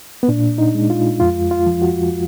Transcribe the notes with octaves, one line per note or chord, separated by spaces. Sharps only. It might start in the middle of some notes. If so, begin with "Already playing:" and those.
B3
A#2 D4
D#4
G#3
F4
F2 F4
F4
F3
F#4